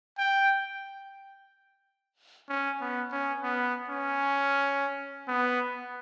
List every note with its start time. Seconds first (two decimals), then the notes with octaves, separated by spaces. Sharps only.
0.18 G5
2.49 C#4
2.81 B3
3.12 C#4
3.42 B3
3.89 C#4
5.28 B3